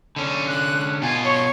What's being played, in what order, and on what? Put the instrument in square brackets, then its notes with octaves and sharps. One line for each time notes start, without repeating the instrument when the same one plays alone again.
[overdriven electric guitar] D3 C#4
[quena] F#6
[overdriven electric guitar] B2 F4 [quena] G#5
[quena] C#5